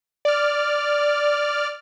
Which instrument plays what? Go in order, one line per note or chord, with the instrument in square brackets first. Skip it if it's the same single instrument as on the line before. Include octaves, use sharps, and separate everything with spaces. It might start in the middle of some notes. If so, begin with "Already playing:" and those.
[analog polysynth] D5 F6